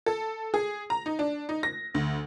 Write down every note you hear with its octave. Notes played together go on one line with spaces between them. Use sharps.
A4
G#4
A#5
D#4
D4
D#4
A#6
D2